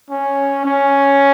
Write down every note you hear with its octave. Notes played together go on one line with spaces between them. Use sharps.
C#4
C#4